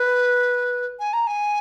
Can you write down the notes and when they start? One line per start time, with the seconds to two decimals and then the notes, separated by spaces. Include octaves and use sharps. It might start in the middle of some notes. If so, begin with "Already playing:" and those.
Already playing: B4
1.00 G#5
1.13 A#5
1.27 G#5